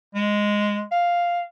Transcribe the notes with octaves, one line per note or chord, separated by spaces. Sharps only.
G#3
F5